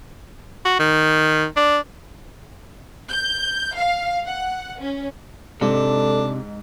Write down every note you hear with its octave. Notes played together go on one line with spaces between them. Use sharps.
F#4
D#3
D4
G6
F5
F#5
C#4
G#2 C3 D4 A4